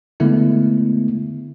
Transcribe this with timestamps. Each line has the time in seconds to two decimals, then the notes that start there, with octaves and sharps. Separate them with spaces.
0.20 D3 G#3 A3 B3 E4